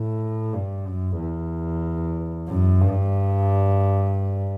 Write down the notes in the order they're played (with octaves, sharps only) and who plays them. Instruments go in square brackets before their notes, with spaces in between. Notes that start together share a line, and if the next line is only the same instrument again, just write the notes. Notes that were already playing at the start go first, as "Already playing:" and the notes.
Already playing: [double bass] A2
G2
F#2
E2
F#2
G2